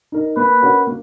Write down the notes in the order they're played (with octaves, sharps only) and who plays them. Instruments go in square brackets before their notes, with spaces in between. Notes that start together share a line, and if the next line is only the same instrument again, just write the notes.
[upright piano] D#4 A#4
[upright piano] A#3 [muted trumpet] B4
[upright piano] C#4 F#4 A#4
A#3